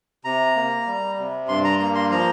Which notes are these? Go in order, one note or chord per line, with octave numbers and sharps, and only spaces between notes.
C3 A#5
A#3
G3
C3
G2 C6
A#5
A#3 A#5
C6
F3 A#5